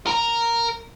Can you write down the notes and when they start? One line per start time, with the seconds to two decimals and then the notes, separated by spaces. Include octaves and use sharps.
0.07 A#4 A#5